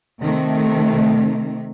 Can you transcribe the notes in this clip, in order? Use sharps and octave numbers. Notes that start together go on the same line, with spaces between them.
C3 D#3 A3